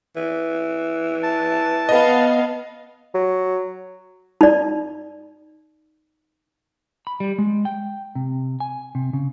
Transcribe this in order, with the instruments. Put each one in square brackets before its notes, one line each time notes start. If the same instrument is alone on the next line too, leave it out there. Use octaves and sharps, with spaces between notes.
[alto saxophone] E3
[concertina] A5
[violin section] B3 F5 [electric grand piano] D#5
[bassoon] F#3
[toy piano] D#4 D5
[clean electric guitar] B5
G3
G#3
G5
C3
G#5
C3
C#3